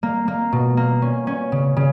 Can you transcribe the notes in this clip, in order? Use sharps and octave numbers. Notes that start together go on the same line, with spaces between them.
A#3
A#3
B2
A#3
C#4
C#4
C#3
C#3